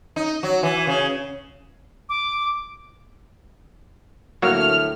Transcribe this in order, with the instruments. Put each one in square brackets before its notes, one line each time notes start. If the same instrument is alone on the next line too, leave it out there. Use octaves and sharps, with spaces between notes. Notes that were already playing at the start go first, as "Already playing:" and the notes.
[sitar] D#4
F#3
E3
C#3
[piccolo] D6
[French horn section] D2 A2 [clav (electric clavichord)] F#3 A#3 F#4 [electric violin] F6